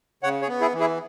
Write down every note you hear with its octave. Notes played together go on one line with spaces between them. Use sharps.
C#3 C#5 F#5
G#4 C#5
B3
E4 G#4
E3
E4 G#4